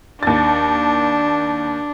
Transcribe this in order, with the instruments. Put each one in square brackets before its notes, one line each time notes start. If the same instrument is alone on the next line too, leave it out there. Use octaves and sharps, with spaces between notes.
[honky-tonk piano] D#2 A6 [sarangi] D4